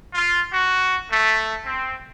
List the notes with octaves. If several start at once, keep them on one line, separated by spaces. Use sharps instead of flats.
F4
F#4
A3
C4